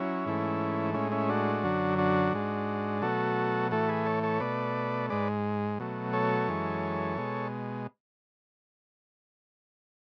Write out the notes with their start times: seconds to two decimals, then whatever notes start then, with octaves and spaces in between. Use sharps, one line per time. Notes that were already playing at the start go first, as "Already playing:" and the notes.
Already playing: F#3 C#4 E4
0.26 G#2 E3 A3
0.94 A2 G#3 C#4 E4
1.12 C#4 E4
1.29 D4 F#4
1.64 F#2 D3 F#3
1.98 D4 F#4
2.33 G#2 G#3
3.02 B2 F#3 A3 F#4 A4
3.71 A2 E3 A3 F#4 A4
3.88 G#4 B4
4.06 A4 C#5
4.23 A4 C#5
4.40 B2 A3 B4 D5
5.09 G#2 G#3 B4 D5
5.80 B2 F#3 A3
6.13 A4 C#5
6.48 F#2 E3 G#3
7.18 B2 G#3